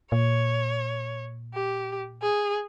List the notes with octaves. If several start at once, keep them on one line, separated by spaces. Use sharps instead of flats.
A#2 C#5
G4
G#4